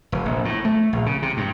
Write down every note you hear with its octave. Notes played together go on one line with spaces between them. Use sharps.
F1
A#1
A2
A3
A#1
C#3
C3
G2